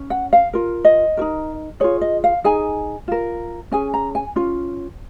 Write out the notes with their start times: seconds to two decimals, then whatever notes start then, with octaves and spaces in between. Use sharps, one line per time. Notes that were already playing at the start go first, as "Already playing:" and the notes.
Already playing: C#4
0.10 F#5
0.33 F5
0.53 F4 A#4
0.85 D#5
1.17 F#4 A#4
1.21 D#4
1.80 F4 G#4 C#5
2.01 D#5
2.24 F5
2.44 D#4 G#4 G#5
3.08 F4 A#4
3.72 C#4 G#4 G#5
3.94 A#5
4.15 G#5
4.36 C#4 F4